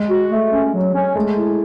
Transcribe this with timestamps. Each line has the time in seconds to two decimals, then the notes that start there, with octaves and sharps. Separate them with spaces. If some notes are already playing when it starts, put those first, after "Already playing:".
Already playing: G#3
0.09 F#4
0.31 A3
0.52 C#4
0.73 F#3
0.95 C#4
1.15 G#3 A3
1.37 E4